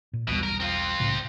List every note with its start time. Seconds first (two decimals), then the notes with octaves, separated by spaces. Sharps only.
0.13 A#2
0.28 B1 E2 B2 G3
0.43 A#4
0.60 C4 F4
1.00 C2 A2 C#3